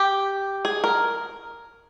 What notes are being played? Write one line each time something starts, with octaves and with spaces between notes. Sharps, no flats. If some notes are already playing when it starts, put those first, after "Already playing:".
Already playing: G4
G#4
A#4